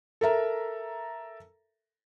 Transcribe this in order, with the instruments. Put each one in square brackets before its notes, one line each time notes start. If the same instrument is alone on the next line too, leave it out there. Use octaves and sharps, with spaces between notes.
[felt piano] A4 A#4 E5 A#5